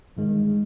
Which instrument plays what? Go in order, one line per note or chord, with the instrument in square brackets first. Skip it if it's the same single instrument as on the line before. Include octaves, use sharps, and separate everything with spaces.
[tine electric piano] G2 D#3 G#3